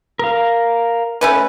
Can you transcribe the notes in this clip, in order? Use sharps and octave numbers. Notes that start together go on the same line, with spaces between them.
A#4 F5
A3 C#4 B4